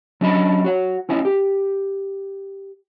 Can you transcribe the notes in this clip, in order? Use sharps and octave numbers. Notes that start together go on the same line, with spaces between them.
F#3 C#4 D4 D#5 A5 B5
F#4 C#5 F#5
C4 C#4 E4 D#5
G4